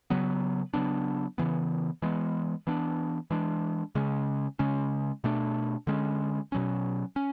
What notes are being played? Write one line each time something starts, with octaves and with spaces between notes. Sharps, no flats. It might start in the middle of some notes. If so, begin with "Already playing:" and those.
C#3 F#3 B3
C#3 F#3 B3 D4
C#3 E3 B3
E3 G#3 B3
E3 B3 D4
E3 G#3 D4
C#3 G#3 C#4
C#3 G#3 C#4
B2 A3 D4
D3 G#3 C#4
B2 F#3 C#4
C#4